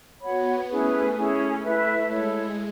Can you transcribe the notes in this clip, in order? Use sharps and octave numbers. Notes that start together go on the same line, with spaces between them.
B3 F#4 C#5 F#5 B5
A3 C#4 E4 G#4 B4
C#4 E4 G#4
E4 B4 E5
G#3 E4 A4 C#5